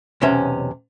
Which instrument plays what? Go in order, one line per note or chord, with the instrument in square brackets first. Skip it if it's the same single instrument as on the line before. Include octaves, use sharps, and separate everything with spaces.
[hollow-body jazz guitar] B1 E2 C3 C#4 E5